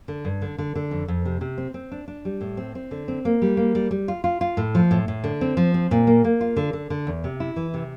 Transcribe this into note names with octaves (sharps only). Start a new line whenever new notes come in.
D3
G2
D3
D3
D3
F2
F2
C3
C3
C4
C4
D4
D4
G3
A2
C4
C4
D3
C4
A#3
G3
A#3
G3
G3
F4
F4
F4
A2
F3
A2
A2
D3
C4
F3
C4
A#2
A#3
A#3
F4
D3
D3
D3
E2
C3
E4
E3
C3